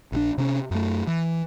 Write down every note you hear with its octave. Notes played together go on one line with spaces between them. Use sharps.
A#1 E3 D4
C3 C#4
F#2 A3
E3